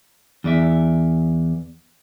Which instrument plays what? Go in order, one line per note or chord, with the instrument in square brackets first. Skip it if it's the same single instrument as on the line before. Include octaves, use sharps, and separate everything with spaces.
[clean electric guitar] E2 D5 E5